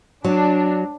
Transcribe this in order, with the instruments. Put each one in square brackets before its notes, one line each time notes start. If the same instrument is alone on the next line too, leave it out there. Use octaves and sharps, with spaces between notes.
[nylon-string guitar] F#3 [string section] D4